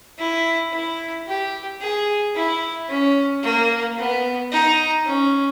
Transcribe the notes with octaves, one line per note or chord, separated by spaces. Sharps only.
E4
E4
G4
G#4
E4
C#4
A#3
B3
D#4
C#4